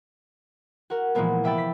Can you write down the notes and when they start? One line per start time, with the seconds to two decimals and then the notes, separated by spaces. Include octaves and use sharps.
0.90 F#4 A#4
1.15 A#2 E3 F3 G#3 A#3 B3
1.44 C3 E5 G5 B5 A6
1.58 B6